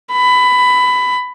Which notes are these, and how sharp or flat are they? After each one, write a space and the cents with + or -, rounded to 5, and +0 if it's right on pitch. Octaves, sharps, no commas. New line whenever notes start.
B5 +15